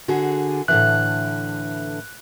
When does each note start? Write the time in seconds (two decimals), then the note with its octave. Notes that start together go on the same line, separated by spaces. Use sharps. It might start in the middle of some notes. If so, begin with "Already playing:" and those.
0.08 D3 F#4 G#4
0.68 A2 D3 E3 F#6